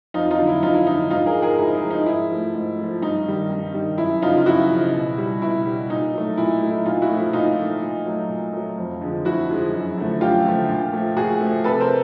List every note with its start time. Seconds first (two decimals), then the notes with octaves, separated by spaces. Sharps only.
0.14 F2 D#4 F4
0.31 D#4 F4
0.38 D3 F#3
0.47 E4
0.63 F2 D#4 F4
0.74 E4
0.86 D3 F#3 D#4
1.10 G#2 D#4 F4
1.26 G#4 A#4
1.34 F3 G#3
1.42 G#4 A#4
1.58 G#2 E4
1.75 D#4
1.82 F3 G#3
1.90 D#4
2.06 G#2 E4
2.31 F3 A3
2.54 G#2
2.79 F3 A3
3.02 G2 D#4
3.26 D#3 G3
3.50 G2
3.74 D#3 G3
3.98 F#2 E4
4.22 C#3 F3 D#4 F4
4.37 F4
4.46 F#2 E4 F#4
4.70 C#3 F3
4.94 B2
5.18 G3
5.42 B2 E4
5.66 G3
5.90 A#2 D#4
6.13 F#3 A3
6.38 A#2 E4
6.62 F#3 A3
6.70 E4
6.86 A#2 D#4 F4
7.02 E4 F#4
7.10 F3 A3
7.17 E4
7.33 A#2 D#4 F4
7.58 F3 A3
7.81 A#2
8.06 F#3 A3
8.29 A#2
8.53 F#3 A3
8.78 F2
9.01 D3 F3 G#3
9.25 F2 E4 F#4
9.50 D3 F3 G#3
9.73 F#2
9.97 D3 F3 A3
10.21 F#2 F4 G4
10.45 D3 F3 A3
10.69 A#2
10.93 F3 A3
11.16 A#2 F#4 G#4
11.41 F3 A3
11.64 C3 A4 B4
11.80 A#4 C5